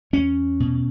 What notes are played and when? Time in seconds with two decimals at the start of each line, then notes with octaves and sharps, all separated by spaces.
0.13 E2 C#4
0.60 B2